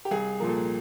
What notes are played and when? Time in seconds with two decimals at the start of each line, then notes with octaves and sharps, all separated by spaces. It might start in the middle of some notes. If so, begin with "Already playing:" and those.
0.05 G4
0.11 C2 G#4
0.40 A#2 F3 A#3
0.49 A4